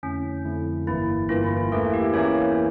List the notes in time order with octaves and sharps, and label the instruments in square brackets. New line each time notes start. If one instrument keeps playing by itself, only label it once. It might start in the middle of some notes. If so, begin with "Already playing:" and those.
[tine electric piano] F2 D3 A3 E4 [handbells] C#4
[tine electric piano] F2 D3 A3 E4
[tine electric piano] G1 G2 E3 A#3 [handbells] E4
[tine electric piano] G1 G2 E3 A#3 [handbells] F4
[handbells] E4
F4
[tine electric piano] E2 E3 A#3 [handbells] A3 A4
[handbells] G4
[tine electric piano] E2 E3 A#3 [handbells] C#4 C#5